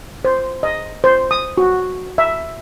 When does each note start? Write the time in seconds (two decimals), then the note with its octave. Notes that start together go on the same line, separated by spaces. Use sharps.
0.25 C5
0.63 D#5
1.04 C5
1.31 D#6
1.58 F#4
2.18 E5